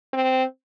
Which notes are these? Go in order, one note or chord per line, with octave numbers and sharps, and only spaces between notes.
C4